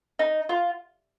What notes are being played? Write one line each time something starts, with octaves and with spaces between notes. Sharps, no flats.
D#4
F4